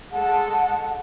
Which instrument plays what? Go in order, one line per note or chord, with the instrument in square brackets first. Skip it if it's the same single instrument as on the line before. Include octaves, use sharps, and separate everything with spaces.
[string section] G#3 A4 [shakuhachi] F#5